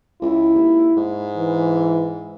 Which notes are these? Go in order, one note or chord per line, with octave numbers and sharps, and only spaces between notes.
C#2 E4
D#2
G#2
E3